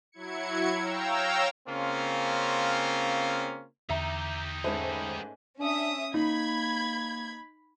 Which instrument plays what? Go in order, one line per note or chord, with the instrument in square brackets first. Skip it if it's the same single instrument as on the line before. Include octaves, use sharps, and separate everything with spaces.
[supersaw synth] F#3 E4 G#6 C#7
C#5 F5 G5 A#5 E6
[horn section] C#3 A#3 C4 C#4 F4
[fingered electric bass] E2 D3 [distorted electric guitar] D#4 G4 [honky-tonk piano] E5 A#5
[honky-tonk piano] G#2 B4 C5 [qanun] A3 C#4
[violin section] C#4 E5 D#6 [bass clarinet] D4
[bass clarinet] A#3 [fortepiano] D#4 [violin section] B5 G#6